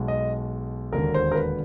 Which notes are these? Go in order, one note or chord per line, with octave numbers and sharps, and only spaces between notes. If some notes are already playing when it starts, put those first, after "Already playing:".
Already playing: B1 B2 G#3
D#5
E1 D#2 D3 A#4
C5
A#4
B4